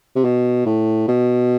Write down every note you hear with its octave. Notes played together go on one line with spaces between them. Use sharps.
C3
B2
A2
B2